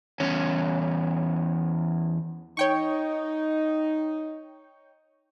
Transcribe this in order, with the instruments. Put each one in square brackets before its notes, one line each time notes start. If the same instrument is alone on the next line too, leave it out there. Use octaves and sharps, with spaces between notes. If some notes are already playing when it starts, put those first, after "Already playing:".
[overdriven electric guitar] E2 C#4
[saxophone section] D#4 [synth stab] C#5 G5 C#6